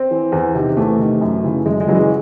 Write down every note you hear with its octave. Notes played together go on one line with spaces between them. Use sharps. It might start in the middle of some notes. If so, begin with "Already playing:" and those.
Already playing: C4
E3
E2
C3 D#3
E2 A3
C3 D#3
F#2
C#3 E3
F#2 G#3
G#3
C#3 E3 F#3
G#3